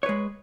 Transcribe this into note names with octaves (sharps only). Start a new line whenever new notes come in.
G#3 B4 C#5